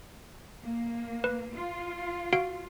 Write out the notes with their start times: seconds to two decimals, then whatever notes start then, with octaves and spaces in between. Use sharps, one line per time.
0.63 A#3
1.24 B4
1.56 F4
2.33 F#4 F5 D7